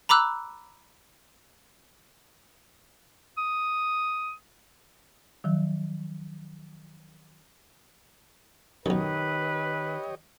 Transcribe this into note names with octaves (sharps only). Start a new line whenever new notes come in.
A#5 B5 D6 E6 F#6
D#6
D#3 F3 F#3
B1 F#2 D#3 G4 B4 C#5 D#5